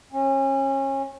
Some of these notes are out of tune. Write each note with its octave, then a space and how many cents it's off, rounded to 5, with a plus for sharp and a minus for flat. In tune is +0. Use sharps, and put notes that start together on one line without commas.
C#4 -30